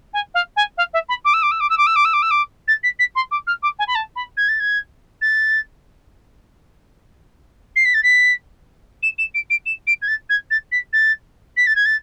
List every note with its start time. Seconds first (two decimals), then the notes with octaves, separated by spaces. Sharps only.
0.13 G#5
0.34 F5
0.56 G#5
0.77 F5
0.93 E5
1.09 B5
1.25 D6
1.33 E6
1.42 D6
1.51 E6
1.60 D6
1.69 E6
1.77 D6
1.86 E6
1.96 D6
2.05 E6
2.13 D6
2.22 E6
2.31 D6
2.68 A6
2.83 B6
2.99 B6
3.15 C6
3.31 D6
3.47 F6
3.62 D6
3.79 G#5
3.87 B5
3.95 A5
4.16 B5
4.37 G#6
4.48 A6
4.60 G#6
5.21 A6
7.76 C7
7.85 B6
7.94 A6
8.03 B6
9.03 E7
9.18 E7
9.34 D7
9.50 D7
9.66 E7
9.87 D7
10.02 G#6
10.08 A6
10.29 G#6
10.50 A6
10.72 B6
10.93 A6
11.57 B6
11.67 A6
11.75 G#6
11.85 A6